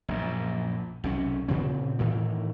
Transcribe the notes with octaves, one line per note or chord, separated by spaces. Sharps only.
A#1 F#2 A#2
B1 C3 C#4
A#2 C#3 C4
A2 D#3 E3